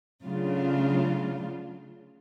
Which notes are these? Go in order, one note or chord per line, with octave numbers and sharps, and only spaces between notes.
C#3 F#3 A3 D4 F4